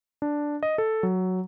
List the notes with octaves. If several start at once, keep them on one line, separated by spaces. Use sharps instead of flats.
D4
D#5
A4
F#3